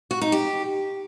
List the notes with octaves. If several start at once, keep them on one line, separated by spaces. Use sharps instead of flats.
F#4
D#4
G4